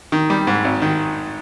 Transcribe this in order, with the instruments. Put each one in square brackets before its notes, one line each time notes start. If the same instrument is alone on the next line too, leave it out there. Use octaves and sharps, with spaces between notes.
[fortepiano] D#3
G3
G#2
G#1
D#3